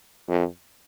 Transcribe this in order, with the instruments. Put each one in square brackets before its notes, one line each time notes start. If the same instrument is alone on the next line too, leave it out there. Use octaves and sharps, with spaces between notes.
[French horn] F2